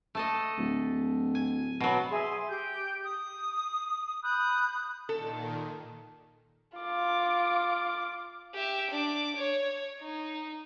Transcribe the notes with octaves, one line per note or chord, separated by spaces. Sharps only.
A3 A4 D#5
D1
G#5
B2 F#3
G#4 E5 C6
G4 G6
D#6
B5 D#6 F#6 G6
A#2 D#3 A4
F4 D6
G4 E5
D4 D6
C#5
D#4